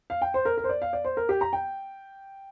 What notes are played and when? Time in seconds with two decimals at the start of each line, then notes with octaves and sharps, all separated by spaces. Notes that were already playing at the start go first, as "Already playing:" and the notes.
0.10 F5
0.22 G5
0.34 C5
0.45 A#4
0.57 A#4
0.64 C5
0.69 D5
0.82 F5
0.93 D5
1.04 C5
1.17 A#4
1.29 G4
1.41 A#5
1.53 G5